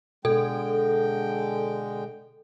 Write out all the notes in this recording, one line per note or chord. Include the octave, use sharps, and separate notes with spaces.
B2 D3 G#3 A4 G5